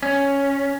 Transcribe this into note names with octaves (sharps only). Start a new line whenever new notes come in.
C#4